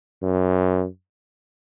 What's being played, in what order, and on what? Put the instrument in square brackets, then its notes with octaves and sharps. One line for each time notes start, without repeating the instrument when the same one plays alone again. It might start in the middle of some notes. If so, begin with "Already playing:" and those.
[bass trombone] F#2